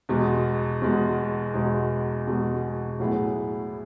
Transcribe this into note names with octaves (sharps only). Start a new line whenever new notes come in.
E2 B2 G#3
E2 B2 G#3
E2 B2 G#3
E2 B2 G#3
A2 F#3 B3 E4 G#4